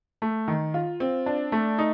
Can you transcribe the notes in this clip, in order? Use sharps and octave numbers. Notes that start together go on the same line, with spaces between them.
A3
D#3
F4
C4
D4
A3
D#4